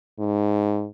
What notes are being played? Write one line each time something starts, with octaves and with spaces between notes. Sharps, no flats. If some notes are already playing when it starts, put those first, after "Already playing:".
G#2